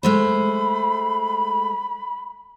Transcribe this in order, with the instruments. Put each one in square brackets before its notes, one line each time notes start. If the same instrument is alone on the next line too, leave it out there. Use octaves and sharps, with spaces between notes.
[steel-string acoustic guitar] G#3 A3 C5 [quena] B5